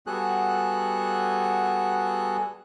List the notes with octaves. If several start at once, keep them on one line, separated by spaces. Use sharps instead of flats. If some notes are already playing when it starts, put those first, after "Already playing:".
G3 B3 F#4 G#4 A4 F#6